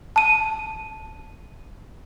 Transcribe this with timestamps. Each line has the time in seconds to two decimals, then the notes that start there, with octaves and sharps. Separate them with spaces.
0.16 A5 D#7